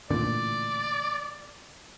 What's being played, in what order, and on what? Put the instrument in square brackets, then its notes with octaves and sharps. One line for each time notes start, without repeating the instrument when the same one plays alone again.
[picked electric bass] A1 A#2 D3 [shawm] D5